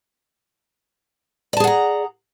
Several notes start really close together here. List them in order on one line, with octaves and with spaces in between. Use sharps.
D5 A5 G#4 F#5 A#5